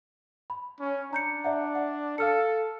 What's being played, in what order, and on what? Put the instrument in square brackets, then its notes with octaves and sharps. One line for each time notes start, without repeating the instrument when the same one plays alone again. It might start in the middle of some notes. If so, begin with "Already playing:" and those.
[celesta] B5
[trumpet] C#4
[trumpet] D4 [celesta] A#5 G6 C#7
[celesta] D5 E5 F#5
F#5
[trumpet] A4 [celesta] F5 F6 C#7